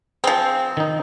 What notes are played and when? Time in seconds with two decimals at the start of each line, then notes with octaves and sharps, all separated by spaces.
0.24 F3 C4 G#4
0.77 D#3 D#4